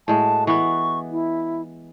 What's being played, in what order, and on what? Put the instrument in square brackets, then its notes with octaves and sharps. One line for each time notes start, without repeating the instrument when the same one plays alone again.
[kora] A2 G#3 F#4 [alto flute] A5
[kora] E3 B3 [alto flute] C#6
[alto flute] E4